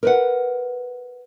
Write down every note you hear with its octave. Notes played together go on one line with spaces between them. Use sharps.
A#4 B4 F#5